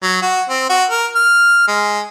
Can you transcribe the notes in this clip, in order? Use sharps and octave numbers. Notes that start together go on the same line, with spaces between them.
F#3
F#4
C4
F#4
A#4
F6
G#3